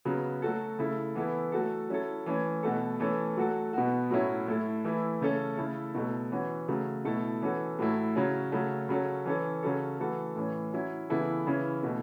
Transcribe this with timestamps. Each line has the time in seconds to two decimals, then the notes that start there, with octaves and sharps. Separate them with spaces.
0.05 C#3 F#3 B3
0.42 F#3 A3 F#4 A4
0.79 C#3 A3 E4 A4
1.15 E3 B3 E4 A4
1.52 F#3 A3 F#4 A4
1.89 F#3 C#4 E4 A4
2.26 E3 A3 C#4
2.63 B2 A3 F#4 A4
2.99 E3 A3 C#4 A4
3.37 F#3 A3 F#4 A4
3.73 B2 B3 F#4
4.10 A2 F#3 A3 C#4 E4
4.47 A2 A3 E4 A4
4.84 E3 A3 E4
5.20 C#3 A3 C#4 A4
5.57 C#3 A3 E4 A4
5.94 B2 F#3 A3
6.31 E3 C#4 F#4
6.68 C#3 F#3 A3
7.05 B2 A3 E4 A4
7.42 E3 C#4 F#4 A4
7.79 A2 F#3 A3 E4
8.16 C#3 F#3 C#4
8.52 C#3 F#3 A3 C#4
8.89 C#3 F#3 C#4 A4
9.26 E3 C#4 A4
9.63 C#3 F#3 C#4 A4
9.99 E3 A3 F#4 A4
10.36 A2 E3 C#4
10.73 F#3 C#4 E4
11.10 C#3 E3 B3 E4 A4
11.47 C#3 E3 C#4 E4
11.83 B2 A3